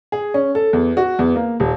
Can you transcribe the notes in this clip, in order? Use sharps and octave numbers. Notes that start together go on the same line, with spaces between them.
G#4
C#4
A4
E2
F#4
E2
A#3
D#1